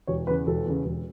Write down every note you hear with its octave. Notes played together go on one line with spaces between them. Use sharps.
E1 C#5
E2 C#3 B4
E1 A4
E2 C#3
E1